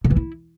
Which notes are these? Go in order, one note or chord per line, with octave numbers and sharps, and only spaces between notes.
D3
E3
E4